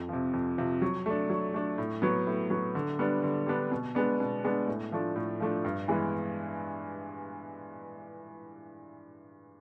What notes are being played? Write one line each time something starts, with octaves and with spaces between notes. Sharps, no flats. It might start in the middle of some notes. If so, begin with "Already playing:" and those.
Already playing: F2
C3 F3
F2
C3 F3
F#3
A3 D4
F#3
A3 D4
A2
F#3 B3
A2
F#3 B3
D3
G3 B3 D4
D3
G3 B3 D4
B2
G#3 B3 D4
B2
G#3 B3 D4
A2
F3 A3 D4
A2
F3 A3 D4
G2
E3 G#3 B3 E4